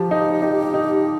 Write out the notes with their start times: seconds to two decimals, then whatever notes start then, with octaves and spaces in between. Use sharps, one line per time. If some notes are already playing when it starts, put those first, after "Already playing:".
Already playing: F3 G4
0.11 D#4
0.42 D#4
0.74 D#4